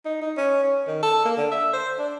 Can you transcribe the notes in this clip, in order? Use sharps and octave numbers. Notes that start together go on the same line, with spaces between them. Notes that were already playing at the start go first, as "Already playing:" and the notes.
D#4
D#4
C#4
C#4
D#3
A4
A#3
D3
E5
C5
D4